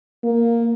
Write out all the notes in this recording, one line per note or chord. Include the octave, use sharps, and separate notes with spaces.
A#3